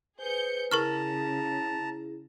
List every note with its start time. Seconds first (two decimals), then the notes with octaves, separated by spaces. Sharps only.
0.19 G#4 B4 C5 G6 C#7
0.71 C#3 E4 G#4 A#4 A5 A#5 C#6 F6